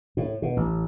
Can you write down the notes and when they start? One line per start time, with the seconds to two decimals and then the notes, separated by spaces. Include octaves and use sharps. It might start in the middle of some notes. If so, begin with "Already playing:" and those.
0.17 A2
0.42 B2
0.57 A1